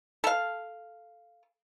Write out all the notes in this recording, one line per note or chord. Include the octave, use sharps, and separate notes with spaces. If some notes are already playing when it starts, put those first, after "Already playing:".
A4 F5